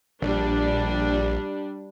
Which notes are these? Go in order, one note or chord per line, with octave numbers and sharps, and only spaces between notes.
A#1 G3 D4